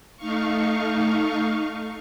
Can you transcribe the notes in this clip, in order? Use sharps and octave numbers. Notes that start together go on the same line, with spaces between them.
A3 D#4 F5 C#6